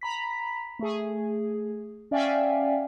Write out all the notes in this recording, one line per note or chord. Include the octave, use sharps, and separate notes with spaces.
A#5 B5 B6
A3 G#4
C#4 D5 E5 F5 G5 G#5